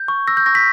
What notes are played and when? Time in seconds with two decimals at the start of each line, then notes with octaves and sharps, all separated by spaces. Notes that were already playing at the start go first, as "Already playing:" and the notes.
Already playing: G6
0.08 C#6
0.28 E6 A#6
0.37 G6
0.46 C#6 A#6
0.55 B6